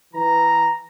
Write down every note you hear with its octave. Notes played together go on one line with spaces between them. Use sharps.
E3 A#5